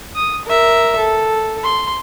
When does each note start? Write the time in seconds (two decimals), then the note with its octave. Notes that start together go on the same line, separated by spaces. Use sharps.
0.15 D#6
0.45 A#4 E5
0.97 A4
1.64 C6